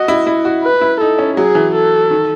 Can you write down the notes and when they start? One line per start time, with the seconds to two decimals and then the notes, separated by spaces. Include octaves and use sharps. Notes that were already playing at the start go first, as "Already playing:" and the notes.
Already playing: F#4 D#5
0.08 E4
0.27 E4
0.45 F#4
0.63 B4
0.81 E4
1.01 D#4 A4
1.19 C#4
1.37 F#3 G#4
1.55 E3
1.75 A4
2.10 D#3